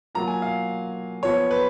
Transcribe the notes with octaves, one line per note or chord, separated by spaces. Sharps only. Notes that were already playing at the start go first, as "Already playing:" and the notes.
F#3 A#3 F4 A#5
G#5
F5
F3 B3 F4 C#5
B4